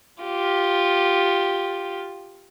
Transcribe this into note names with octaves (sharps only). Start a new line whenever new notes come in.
F4 G4